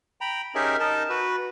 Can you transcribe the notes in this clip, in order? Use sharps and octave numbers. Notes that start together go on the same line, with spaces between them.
G5 A#5 B5
C#4 D#4 G4 G#4 A#4 E5
D#4 A#4 D#5 A5
F#4 B4